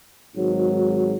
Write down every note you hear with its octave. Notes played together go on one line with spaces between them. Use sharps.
G#1 G#2 F#3